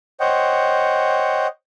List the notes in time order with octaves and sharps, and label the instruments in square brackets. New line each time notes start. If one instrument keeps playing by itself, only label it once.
[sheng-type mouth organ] C5 C#5 D#5 F#5 G5